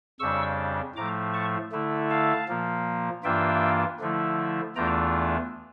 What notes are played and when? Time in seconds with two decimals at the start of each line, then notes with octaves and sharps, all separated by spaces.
0.20 F2 C#3 G3 D4 C#6 E6
0.96 A2 F3 A3 A#5 D6
1.34 A5 C#6
1.72 D3 A3 E4
2.10 F5 A5
2.48 A#2 F3 A#3
3.24 G2 E3 A#3 D4 F4 E5 G5
4.00 D3 F3 A3 E4
4.76 E2 E3 A3 D4 F4 G5 A#5